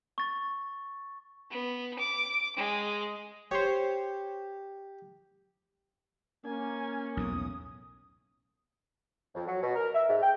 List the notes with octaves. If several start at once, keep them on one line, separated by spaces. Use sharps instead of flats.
C#6 A6
B3
D6
G#3
G4 C5 C#5
A#3 C#4 G#5
B1 E2 A2 D#6
F2
F#3
B2
A#4
E5
G#2
G5